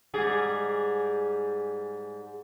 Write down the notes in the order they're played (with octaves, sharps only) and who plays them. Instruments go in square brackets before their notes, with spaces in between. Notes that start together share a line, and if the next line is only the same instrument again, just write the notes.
[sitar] G#2 G3 G#4